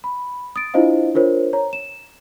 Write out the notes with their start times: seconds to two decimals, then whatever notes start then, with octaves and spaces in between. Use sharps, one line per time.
0.04 B5
0.56 D#6 A6 D7
0.74 D4 E4 F4 C5 D#5 F5
1.14 D4 F4 A#4 C5 C#5
1.53 C#5 A#5
1.73 E7